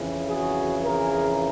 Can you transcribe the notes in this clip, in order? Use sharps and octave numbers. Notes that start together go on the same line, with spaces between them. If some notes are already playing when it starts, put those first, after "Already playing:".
Already playing: F2 C#3 E3
F#4 G#4
G#4 A#4